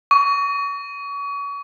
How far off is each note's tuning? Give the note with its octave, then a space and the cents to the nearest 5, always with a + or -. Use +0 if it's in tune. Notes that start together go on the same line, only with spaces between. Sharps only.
C#6 +35